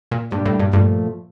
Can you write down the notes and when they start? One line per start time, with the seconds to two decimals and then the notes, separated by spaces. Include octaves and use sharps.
0.11 A#2
0.32 G2 A#2 G3 D4 G4
0.46 A2
0.60 G2
0.73 G2 A#2 F3 A3